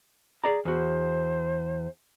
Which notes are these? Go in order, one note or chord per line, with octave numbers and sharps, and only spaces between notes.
G#4 D5 A#5
E2 F#4 C5